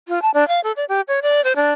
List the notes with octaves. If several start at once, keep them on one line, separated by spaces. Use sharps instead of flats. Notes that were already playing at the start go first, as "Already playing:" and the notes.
F4
A5
D4
F5
A4
D5
G4
C#5
D5
C5
D4